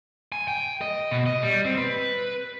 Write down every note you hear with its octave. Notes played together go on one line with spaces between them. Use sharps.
G#5
G5
D#5
B2
D#5
G3
C4
B4